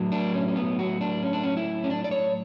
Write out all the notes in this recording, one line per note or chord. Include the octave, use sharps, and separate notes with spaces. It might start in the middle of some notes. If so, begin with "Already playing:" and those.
Already playing: A2 F#3
D4
C#4
C#4
B3
F#4
D4
C#4
D4
C#4
E4
C#4
D4
D5
C#5